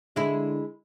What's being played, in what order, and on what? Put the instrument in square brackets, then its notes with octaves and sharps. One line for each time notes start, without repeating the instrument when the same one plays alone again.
[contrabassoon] D3 [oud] G#3 E4